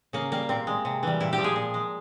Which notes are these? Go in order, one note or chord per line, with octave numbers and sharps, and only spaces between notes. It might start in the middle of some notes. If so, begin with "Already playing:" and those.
C#3 A#3
G3 A#3
A#2 C4
G#3
C3
E3 G3
A#2 E4
G4
F3
G#3 G#4
A#2
G#3